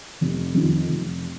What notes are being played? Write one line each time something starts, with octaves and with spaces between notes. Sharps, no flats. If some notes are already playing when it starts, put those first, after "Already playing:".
F1
F2 D#3
F1